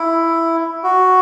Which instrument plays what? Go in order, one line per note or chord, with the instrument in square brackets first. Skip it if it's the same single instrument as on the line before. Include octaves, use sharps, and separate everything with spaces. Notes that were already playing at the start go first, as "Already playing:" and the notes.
Already playing: [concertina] E4
F#4